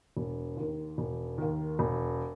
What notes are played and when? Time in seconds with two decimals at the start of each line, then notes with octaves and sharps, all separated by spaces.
0.17 E1
0.57 D#2 D#3
0.98 E1
1.38 D#2 D#3
1.79 E1